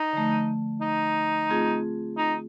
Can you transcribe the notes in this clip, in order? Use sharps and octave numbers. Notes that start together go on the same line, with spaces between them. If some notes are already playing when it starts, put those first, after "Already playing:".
Already playing: D#4
D3 F3 A3
D#4
A3 C4 F4 G#4
D#4